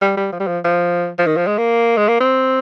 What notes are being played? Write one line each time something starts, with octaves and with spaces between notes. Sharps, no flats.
G3
G3
F3
G3
F3
F3
F3
D#3
F3
G#3
A#3
G#3
A#3
C4